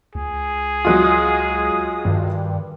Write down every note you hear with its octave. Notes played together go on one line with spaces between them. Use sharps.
C#2 G#4
F#3 G#3 F4 D#6
G2 D#3